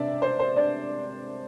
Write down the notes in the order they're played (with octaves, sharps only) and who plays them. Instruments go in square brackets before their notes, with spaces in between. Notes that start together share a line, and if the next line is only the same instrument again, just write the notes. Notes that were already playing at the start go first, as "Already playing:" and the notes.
Already playing: [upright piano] C3 C4 D4 D5 E5
C5
C5
D4 D5